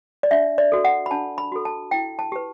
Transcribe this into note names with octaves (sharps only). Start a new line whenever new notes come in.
D5
D4 E5
D5
F#4 A4
F#5
B5
D4 A5
B5
F#4 A4
A5
E4 G5
A5
G4 B4